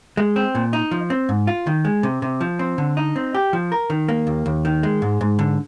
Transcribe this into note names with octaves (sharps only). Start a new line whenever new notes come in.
G#3
C4
A#2
D#4
F3
C4
G#2
F4
D#3
G#3
C3
C3
F3
C4
D3
D#4
C4
G4
F3
A#4
D#3
A#3
D#2
D#2
D#3
G#3
G#2
G#2
D3